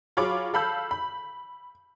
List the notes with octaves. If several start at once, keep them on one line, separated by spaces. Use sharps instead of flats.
F#3 F4 G#4 C#5 B5 D6
A4 F5 B5 E6 G6
B5